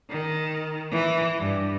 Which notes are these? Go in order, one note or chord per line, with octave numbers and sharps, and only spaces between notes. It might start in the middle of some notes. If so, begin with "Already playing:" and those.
D#3
E3
G2